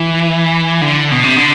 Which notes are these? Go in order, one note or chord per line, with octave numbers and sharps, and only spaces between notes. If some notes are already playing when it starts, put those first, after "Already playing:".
Already playing: E3
D3
B2
C3
D3